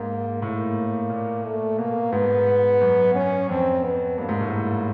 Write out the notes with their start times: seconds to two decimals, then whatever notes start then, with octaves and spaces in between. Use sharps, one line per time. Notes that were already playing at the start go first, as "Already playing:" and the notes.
Already playing: G#2 A#3
0.42 A2 A#3
1.10 A#2
1.44 A3
1.78 B2 A#3
2.12 G#2 B3
2.81 F#2
3.15 C#4
3.49 F2 C4
3.83 B3
4.18 G2 A#3
4.29 G#2
4.40 A2
4.52 A#3